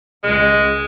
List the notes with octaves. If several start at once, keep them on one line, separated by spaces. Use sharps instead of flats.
C#2 G#3